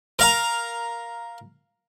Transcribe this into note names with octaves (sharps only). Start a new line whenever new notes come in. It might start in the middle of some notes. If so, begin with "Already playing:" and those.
A#4 F5 A#5